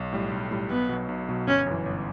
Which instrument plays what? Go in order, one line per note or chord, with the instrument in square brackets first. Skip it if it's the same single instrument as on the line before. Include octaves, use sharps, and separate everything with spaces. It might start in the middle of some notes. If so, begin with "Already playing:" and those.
Already playing: [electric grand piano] B1
A2 G3
B1
A2 G3
[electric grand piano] B1 [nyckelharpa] B3
[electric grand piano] B2 F#3
B1
B2 F#3
[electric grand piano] G1 [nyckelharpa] C#4
[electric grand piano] F#2 E3
G1